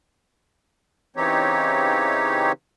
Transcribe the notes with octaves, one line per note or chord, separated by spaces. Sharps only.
C#3 E3 C4 D#4 G4 C#5